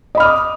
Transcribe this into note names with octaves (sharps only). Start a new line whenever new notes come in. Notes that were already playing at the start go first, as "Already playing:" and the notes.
D#5 B5 D6 D#6 F6